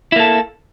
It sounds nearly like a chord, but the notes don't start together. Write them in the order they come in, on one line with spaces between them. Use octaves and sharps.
E4 A#3 A4